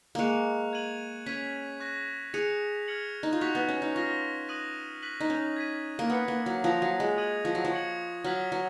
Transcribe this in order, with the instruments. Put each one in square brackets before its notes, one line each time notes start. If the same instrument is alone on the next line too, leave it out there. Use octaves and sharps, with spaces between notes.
[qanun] G#3 A#3 [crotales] C#6 F#6 C#7 F7
[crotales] G#6 D#7 F#7
[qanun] C#4 [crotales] G#6 B6 D#7
[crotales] C#6 F#6 A#6
[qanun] G#4 [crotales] F#6 C#7 F7
[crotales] F6 G#6 C#7 F#7
[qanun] D#4
F4
[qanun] F#4 [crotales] C#6 F#6 B6 F7
[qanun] B3
C#4
D#4
[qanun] F4 [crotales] C#6 F6 A#6
[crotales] D#6 F#6 A#6 D#7 F#7
F#6 B6 D#7 F#7
[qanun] D#4
C#4
[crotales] G#6 B6 D#7
[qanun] A#3
[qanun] B3 [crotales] D#6 F#6 C#7
[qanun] A#3
F#3
[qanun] F3 [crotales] D#6 F#6 A#6 F7
[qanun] F#3
G#3
[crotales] D#6 G#6 D#7 F#7
[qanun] F3
F#3
F3
[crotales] C#6 G#6 C#7 F#7
[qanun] F#3 [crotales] F6 G#6 B6 F#7
[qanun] F#3